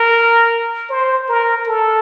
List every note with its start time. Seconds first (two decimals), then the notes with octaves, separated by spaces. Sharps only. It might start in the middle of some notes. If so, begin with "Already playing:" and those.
Already playing: A#4
0.90 C5
1.28 A#4
1.67 A4